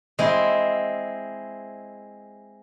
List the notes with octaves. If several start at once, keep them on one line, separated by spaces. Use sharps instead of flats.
G#3 C4 E4